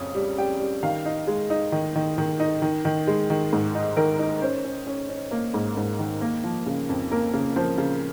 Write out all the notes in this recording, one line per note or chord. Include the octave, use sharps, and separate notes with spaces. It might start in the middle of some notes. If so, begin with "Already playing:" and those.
Already playing: F2 C#3 C#4 D#6
G3
G3 G5
G3
D#3 F5
D#4
G#3
D#4
D#3
D#3
D#3
D#4
D#3
D#3
G#3
D#3
G#2
D#4
D#3 A#4
D#4
C#4 C5
C#4
C#4
C#4
A#3
G#2
G#2
D#3
A#3
F3
C#3
F2
A#3 A#4
C#3
F3 C5
C#3